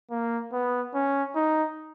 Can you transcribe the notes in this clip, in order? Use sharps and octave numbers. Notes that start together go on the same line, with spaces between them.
A#3
B3
C#4
D#4